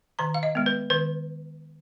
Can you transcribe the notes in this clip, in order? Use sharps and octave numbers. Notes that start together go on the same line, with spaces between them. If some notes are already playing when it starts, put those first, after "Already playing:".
D#3 A#5
F5
D#5
G#3 B3
B4
D#3 B4